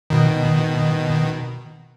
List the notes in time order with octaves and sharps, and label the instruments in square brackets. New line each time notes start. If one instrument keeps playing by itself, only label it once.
[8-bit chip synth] B2 D#3